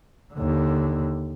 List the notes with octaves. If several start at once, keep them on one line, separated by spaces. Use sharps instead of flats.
D#2 D3